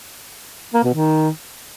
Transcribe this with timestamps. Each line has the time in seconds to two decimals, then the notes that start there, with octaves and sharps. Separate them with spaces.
0.74 A#3
0.84 B2
0.94 D#3